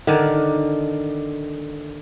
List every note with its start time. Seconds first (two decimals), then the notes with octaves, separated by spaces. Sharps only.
0.07 D3 D#3 D4 A#4